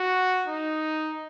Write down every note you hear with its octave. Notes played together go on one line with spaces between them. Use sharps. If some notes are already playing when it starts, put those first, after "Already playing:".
Already playing: F#4
D#4